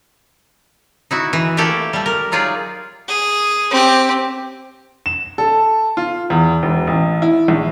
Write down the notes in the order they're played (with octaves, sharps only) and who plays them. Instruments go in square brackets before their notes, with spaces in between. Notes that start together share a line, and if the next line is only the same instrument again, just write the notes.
[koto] D#4 E4 F#4
E3
A3 A#3 E4 G4 A4 D5
G3 A3
A#4
F#3 D#4 F4 G#4 D5
[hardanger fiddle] G#4
C4 G4
[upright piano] E7
A4
F4
E2
E1
A1
E4
A#1